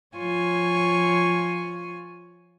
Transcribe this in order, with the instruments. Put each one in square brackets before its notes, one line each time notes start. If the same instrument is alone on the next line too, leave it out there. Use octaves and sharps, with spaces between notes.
[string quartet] F3 F4 C#5 G#5 C#6